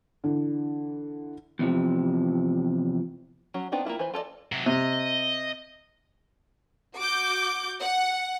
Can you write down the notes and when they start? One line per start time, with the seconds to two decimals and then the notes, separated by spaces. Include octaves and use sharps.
0.24 D3 E3
1.59 E2 C3 F3
3.54 F#3 C#4 F#4
3.72 B3 C4 D4 D#4
3.85 A#3 C4 E4 F4
3.99 E3 B4 C5 B5
4.14 F4 A4 A#4 D5 D#5
4.52 C3 F#3
4.66 C3 D#5
6.96 F#4 D6 G6
7.81 F#5